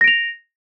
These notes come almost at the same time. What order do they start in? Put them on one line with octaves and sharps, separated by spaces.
A#6 D7 F7